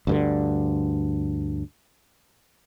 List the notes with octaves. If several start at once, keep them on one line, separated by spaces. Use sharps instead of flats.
D2 G2 D3